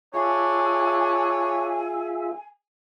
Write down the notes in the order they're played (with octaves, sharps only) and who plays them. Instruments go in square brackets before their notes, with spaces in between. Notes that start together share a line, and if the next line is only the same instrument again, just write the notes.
[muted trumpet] D4 [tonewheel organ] F4 G#4 E5 [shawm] C#5 [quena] G#5